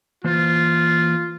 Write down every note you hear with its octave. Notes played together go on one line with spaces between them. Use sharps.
E3 A#3 F4 C5